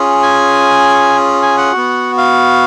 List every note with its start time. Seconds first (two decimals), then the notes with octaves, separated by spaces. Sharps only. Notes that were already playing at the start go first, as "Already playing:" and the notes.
Already playing: C#4 F4 G#4
0.22 G#5
1.42 G#5
1.58 F#5
1.72 B3 F#4
2.18 F5